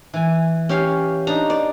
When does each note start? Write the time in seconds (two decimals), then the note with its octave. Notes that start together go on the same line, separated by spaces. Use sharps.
0.14 E3 G#5
0.69 C#4 G4 F5
1.27 D4 D#4 A#5
1.50 D5